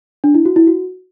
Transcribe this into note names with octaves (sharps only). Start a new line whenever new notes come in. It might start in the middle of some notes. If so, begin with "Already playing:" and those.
D4
E4
F#4
E4
F#4